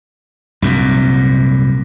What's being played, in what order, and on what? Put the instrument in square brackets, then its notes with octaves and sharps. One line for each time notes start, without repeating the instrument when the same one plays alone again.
[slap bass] C2 F#2 A#2